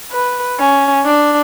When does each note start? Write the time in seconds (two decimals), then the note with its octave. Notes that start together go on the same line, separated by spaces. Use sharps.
0.12 B4
0.59 C#4
1.05 D4